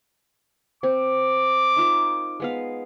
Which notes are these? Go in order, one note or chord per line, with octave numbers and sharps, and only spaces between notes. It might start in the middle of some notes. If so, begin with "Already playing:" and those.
C4 D6
D#4 F4 A#4
G#3 B3 F5